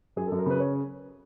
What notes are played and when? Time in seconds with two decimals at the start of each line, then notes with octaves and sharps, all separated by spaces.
0.16 F#2 G#4
0.27 A4
0.31 F#2
0.39 A#4
0.46 C#3 B4
0.60 C#5